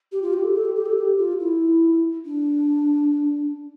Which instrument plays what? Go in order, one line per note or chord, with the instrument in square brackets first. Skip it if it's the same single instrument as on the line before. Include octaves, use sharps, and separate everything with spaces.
[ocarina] G4
F4
G4
A4
A4
G4
G4
A4
G4
F4
E4
D4